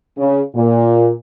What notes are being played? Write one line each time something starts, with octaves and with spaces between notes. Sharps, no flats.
C#3
A#2